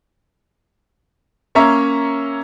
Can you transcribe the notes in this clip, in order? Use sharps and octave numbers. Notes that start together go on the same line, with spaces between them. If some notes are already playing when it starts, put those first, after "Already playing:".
A#3 C#4 C#5 E5 A#5